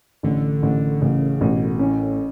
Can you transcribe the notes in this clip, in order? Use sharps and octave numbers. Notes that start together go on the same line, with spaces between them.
A1 D3
A1
A1 C#3
A1 B2
A2 C#4